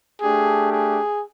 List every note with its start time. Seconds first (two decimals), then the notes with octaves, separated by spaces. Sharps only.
0.21 A3 D4 G4 G#4
0.71 G#4